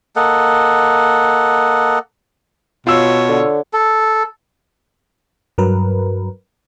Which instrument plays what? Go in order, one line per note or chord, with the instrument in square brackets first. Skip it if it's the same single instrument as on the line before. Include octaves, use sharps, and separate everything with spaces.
[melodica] A#3 A4 D#5 F#5
[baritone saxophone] B2 [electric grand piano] F4 E6 [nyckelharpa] C#5
[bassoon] D3
[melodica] A4
[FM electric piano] G2 F#3 A#4 B4